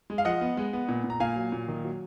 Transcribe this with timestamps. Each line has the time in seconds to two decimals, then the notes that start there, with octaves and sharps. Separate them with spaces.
0.10 G#3
0.18 F5
0.25 F3 D#5 F#5
0.41 B3
0.57 G#3
0.73 B3
0.89 A#2
1.04 A#2
1.10 A#5
1.20 A#2 F5 G#5
1.36 F#3
1.52 A#2
1.68 D#3
1.84 F#3